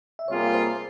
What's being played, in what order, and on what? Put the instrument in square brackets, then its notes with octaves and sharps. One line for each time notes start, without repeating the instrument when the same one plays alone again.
[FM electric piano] E5
[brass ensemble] C3 G3 A#3 F4 G#4 [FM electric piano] C#5
[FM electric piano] C5